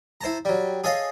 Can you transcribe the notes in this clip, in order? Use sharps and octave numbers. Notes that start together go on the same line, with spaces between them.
E4 C5 A5 A#5
F#3 G3
G#4 A4 C#5 D#5 F5